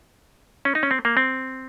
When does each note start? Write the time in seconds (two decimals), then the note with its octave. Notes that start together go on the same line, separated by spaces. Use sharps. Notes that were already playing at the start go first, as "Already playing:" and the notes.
0.65 C#4
0.75 D#4
0.83 C#4
0.91 C4
1.05 A#3
1.17 C4